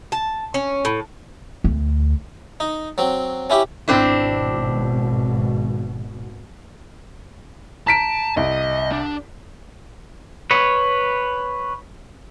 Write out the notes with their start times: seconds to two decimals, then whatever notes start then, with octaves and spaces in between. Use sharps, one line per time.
0.12 A5
0.54 C#4
0.85 A2
1.64 D2
2.60 D#4
2.98 F#3 C4
3.50 C#4 E4 G4
3.88 G#1 B2 C4 D4 E4
7.87 A5 A#5 B6 D7
8.37 C2 D#5
8.92 D4
10.51 B4 C#5